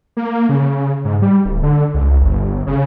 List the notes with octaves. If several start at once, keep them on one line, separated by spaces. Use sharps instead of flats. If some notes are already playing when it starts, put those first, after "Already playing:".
A#3
C#3
G#2
G3
D1
D3
C#2
G1
C#3